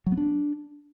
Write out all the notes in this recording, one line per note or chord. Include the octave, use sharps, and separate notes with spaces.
F#3
B3
D4